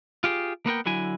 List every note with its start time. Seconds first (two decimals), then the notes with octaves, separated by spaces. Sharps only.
0.24 F4 G4 G#4
0.66 A#3 B3 A#4 G5
0.86 D3 F#3 E4 G#5